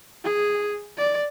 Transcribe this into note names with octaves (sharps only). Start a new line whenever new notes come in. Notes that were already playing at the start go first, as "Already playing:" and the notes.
G#4
D5